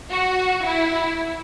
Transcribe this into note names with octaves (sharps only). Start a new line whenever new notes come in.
F#4
E4